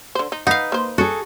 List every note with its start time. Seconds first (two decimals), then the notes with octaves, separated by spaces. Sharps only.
0.15 D3 C5
0.32 D#4
0.47 D#4 B4 F5 F#5
0.72 A#3 C5
0.98 F#4 G#4 A4